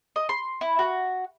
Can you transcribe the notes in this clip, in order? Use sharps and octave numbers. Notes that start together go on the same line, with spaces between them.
D#5
C6
E4
F#4